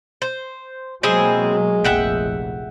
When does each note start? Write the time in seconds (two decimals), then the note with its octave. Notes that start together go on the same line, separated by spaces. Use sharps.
0.22 C5
1.03 B2 F#3 G#3 A#3 C4 E4 G#4
1.84 F1 A#1 E5 F#5 G5